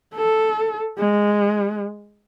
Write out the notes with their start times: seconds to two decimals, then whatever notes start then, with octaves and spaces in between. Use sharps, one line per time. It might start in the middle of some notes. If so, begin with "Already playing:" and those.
0.15 A4
0.98 G#3